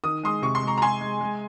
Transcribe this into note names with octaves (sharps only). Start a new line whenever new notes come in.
D#3 D#6
G#3 C6 D#6
C3 C#6
C6
G#3 A#5 C#6
A#5
G#3 G#5 C6
G#3
G#3